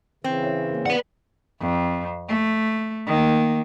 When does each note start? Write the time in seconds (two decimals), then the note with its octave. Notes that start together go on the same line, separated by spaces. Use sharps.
0.24 C#3 E3 C4
0.43 E4 C#5
0.70 A#3
0.86 B4 D5 F#5
1.60 F2
2.29 A3
3.07 D#3 A#3